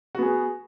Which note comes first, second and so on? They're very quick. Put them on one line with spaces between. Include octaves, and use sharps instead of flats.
F#4 B3 G#4